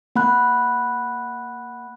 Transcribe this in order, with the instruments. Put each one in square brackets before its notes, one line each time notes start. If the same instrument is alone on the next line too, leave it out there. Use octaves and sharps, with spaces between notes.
[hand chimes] A#3 F#5 B5 F#6